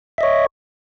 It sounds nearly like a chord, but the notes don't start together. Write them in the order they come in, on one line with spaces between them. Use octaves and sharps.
E5 D#5 C#5